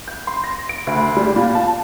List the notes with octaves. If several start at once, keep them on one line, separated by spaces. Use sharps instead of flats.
G6
C6
A#6
D7
D2
G3
A#2
A5